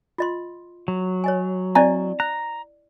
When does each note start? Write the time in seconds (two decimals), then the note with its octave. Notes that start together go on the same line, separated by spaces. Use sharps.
0.18 F4 D#5 C6
0.88 F#3
1.24 C#5 D#5 G#5
1.75 C4 E4 D5 D#5 G#5 A#5
2.20 A#5 F#6